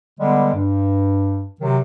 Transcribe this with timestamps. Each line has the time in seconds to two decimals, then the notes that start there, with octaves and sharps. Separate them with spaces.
0.19 D3 G3 G#3 B3
0.55 G2
1.61 C3 D#3 F#3